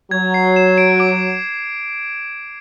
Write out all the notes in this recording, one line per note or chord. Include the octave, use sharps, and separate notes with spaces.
F#3 G#6
C7
E7
D7
D6